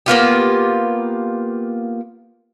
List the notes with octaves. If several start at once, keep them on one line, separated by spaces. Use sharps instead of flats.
A#3 B3 F4 G4